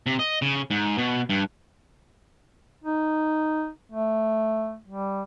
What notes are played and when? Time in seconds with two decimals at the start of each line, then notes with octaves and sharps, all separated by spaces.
0.06 C3
0.19 D#5
0.42 C#3
0.71 G#2
0.98 B2
1.30 G2
2.84 D#4
3.92 A3
4.88 G3